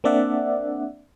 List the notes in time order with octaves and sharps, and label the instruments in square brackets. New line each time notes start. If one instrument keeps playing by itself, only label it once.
[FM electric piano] A#3 C4 D4 D5 E5 F#5